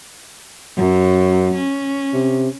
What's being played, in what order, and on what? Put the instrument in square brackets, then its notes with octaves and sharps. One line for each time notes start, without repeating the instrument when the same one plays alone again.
[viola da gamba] F#2 [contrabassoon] F#3
[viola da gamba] C#4
[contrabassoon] C3